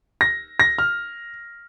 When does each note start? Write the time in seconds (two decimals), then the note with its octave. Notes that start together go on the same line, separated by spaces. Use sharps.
0.21 A#6
0.60 A#6
0.78 F6